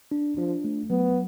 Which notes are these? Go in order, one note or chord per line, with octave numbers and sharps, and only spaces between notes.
D4
F3 D4
A3
F#3 B3